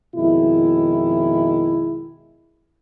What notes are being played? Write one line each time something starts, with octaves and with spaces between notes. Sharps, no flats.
F2 B2 D#3 G#3 E4